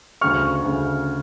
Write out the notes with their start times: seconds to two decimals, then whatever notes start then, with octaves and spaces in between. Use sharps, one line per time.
0.21 D2 C#3 C#6 F6
0.63 D2 C#3